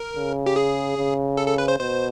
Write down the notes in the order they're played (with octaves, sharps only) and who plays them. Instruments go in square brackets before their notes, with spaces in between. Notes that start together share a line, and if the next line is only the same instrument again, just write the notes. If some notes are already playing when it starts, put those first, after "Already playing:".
Already playing: [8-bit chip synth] A#4
[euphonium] C#3
[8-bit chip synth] G4
G#4
[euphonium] C#3
[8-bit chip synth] A4
A4
B4
C5
[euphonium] B2 [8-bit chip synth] C5